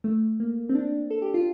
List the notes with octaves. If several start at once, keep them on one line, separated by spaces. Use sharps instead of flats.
A3
A#3
C4
D4
A4
G4
F4